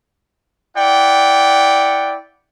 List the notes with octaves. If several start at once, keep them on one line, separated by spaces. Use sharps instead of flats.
E4 D5 F#5 G5